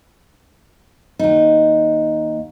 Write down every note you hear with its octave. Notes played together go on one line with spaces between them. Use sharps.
D#2 D#4